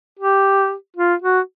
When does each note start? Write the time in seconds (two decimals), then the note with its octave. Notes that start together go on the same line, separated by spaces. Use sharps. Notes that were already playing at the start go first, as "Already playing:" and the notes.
0.19 G4
0.96 F4
1.22 F#4